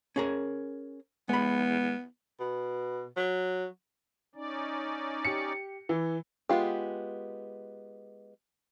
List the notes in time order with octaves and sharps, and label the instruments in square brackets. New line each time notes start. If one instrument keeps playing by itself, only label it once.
[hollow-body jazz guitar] C#4 G#4 A#4
[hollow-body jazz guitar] G#3 B5 [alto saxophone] B3
[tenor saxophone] B2
F#3
[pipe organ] C#4 D#4 D5
[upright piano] G4 C#7
E3
[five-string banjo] G#3 B3 F4 G4